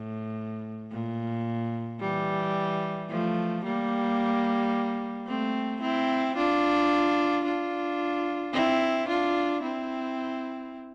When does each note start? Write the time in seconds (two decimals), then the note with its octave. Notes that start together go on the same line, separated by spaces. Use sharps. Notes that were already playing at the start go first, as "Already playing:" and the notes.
Already playing: A2
0.91 A#2
2.00 E3 G3
3.09 F3 A3
3.64 G3 A#3
5.27 A3 C4
5.81 C4 E4
6.36 D4 F4
7.44 D4 F4
8.53 C4 E4
9.08 D4 F4
9.62 C4 E4